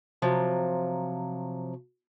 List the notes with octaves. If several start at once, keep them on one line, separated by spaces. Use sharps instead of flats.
C3 F3 F#3